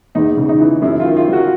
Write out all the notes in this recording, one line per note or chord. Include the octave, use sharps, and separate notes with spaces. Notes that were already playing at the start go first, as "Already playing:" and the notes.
E2 D#4
C#3
D#4
E3
F#2 E4
F4
D#3
F4
F#3 F#4